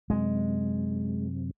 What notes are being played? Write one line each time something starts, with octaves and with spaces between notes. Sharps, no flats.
F#2 C3 G#3